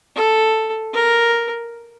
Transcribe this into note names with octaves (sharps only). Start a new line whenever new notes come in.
A4
A#4